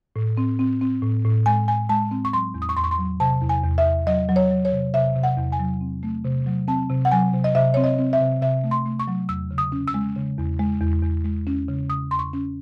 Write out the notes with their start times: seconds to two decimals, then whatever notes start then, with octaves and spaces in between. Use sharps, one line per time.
0.16 A2
0.37 C4
0.59 C4
0.81 C4
1.02 A2
1.24 A2
1.46 G#3 G#5
1.68 A2 G#5
1.89 G#3 A5
2.11 C4
2.25 C#6
2.33 F#3 C6
2.54 E2
2.62 D#6
2.69 C#6
2.77 E2 C6
2.84 C#6
2.91 C6
2.98 F#3
3.20 C3 A5
3.42 E2
3.49 G#5
3.63 E2
3.78 E5
3.85 E2
4.07 F#3 D#5
4.29 F#3
4.36 C#5
4.51 F#3
4.65 C#5
4.72 C3
4.94 C3 E5
5.16 C3
5.23 F#5
5.37 E2
5.52 G#5
5.59 F#3
5.81 C4
6.03 A3
6.25 C3
6.46 F#3
6.68 C4 A5
6.90 C3
7.05 F#5
7.12 F#3 G#5
7.33 C3
7.44 D#5
7.55 C3 E5
7.74 C4 C#5
7.84 D#5
7.99 C4
8.13 E5
8.20 C3
8.42 C3 E5
8.64 A3
8.71 C6
8.86 A3
8.99 C#6
9.07 F#3
9.29 E2 E6
9.51 C#3
9.58 D#6
9.72 C#4
9.88 E6
9.94 G#3
10.16 C#3
10.37 E2
10.60 G#3
10.81 E2
11.03 E2
11.25 G#3
11.47 C#4
11.68 C#3
11.90 C#3 D#6
12.11 E2 C6
12.19 C#6
12.33 C#4